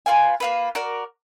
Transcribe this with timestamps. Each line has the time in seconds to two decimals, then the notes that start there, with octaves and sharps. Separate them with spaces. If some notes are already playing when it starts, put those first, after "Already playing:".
0.06 F4 B4 F5 G#5
0.40 A#3 F4 B4
0.75 F#4 A#4 D5